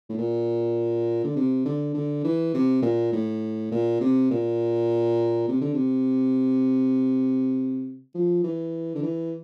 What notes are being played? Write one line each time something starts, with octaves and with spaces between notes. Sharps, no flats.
A2
A#2
D3
C3
D3
D3
E3
C3
A#2
A2
A#2
C3
A#2
C3
D3
C3
F3
E3
D3
E3